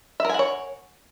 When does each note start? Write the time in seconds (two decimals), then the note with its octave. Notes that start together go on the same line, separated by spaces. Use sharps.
0.20 E5
0.25 A#4
0.29 G#5
0.34 F#5
0.39 C#5